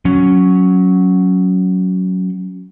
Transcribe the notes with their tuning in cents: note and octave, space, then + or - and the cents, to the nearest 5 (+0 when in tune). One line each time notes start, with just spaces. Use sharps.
F#3 +0 C#4 +0